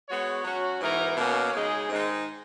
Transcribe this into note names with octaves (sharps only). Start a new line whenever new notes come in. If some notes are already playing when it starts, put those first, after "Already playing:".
G#3 B3 F#4 C#5
F#3 C#4 F#4
G#2 E3 B3 D#4 A#4
B2 A#3 C#4
C#3 G#3 D#4 G#4
G#2 D#3 G#3 D#4